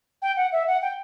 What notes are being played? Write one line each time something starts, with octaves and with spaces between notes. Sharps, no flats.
G5
F#5
E5
F#5
G5